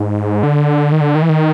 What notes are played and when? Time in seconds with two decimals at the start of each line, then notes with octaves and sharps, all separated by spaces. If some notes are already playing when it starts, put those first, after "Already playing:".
Already playing: G#2
0.43 D3
0.92 D#3
1.01 D3
1.15 D#3
1.22 E3
1.29 D#3